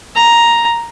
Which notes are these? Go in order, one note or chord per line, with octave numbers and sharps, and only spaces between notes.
A#5